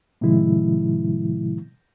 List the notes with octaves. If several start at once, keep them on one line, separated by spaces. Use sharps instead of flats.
A2 C3 D#3 F3 G#3 E4